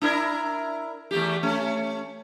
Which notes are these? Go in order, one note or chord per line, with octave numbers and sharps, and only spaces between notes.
D4 E4 A#4
E2 A3 G4
A3 C#4